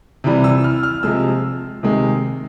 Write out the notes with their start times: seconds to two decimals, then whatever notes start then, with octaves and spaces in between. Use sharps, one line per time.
0.24 C3 E3 G3
0.44 E6
0.64 F6
0.83 F6
1.03 C3 F3 G#3 E6
1.83 C3 D#3 G#3